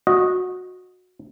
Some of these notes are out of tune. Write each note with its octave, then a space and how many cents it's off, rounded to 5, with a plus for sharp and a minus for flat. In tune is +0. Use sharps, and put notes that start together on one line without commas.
F#4 -20 D#5 +0